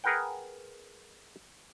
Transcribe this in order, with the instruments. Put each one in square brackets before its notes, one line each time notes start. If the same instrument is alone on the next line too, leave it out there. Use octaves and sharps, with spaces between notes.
[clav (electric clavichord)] G#4 A#4 B4 F#5 G5